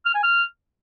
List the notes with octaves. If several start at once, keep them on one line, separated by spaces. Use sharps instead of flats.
F6
G#5
F6